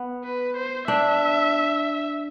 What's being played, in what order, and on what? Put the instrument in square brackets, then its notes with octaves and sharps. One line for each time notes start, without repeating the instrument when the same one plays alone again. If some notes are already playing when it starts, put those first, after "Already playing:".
Already playing: [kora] B3
[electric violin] B4
C5
[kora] D4 [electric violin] E5